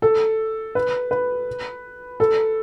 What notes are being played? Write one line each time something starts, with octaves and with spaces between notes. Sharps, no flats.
A4
B4
B4
A4